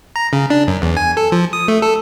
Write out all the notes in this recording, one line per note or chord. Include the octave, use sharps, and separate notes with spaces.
A#5
C#3
D4
F#2
E2
G#5
A4
F3
D#6
A3
A4